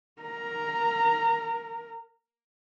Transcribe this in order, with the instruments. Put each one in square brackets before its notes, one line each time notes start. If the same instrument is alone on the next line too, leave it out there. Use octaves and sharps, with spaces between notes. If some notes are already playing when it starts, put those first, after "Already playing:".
[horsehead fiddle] A#4 A#5